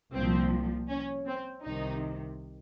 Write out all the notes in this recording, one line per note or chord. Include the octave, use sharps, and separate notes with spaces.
C2 A#2 F3 C4
C#4
C4
C2 C3 D#3 D#4